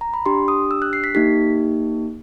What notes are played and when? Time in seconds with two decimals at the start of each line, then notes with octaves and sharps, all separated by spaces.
0.01 A#5
0.14 B5
0.26 D4 G4 C6
0.48 D#6
0.71 E6
0.82 F#6
0.93 C7
1.04 B6
1.15 A#3 D#4 G4 B6